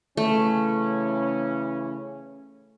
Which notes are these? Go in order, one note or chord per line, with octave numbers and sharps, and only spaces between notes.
C#3 E3 A3 C#4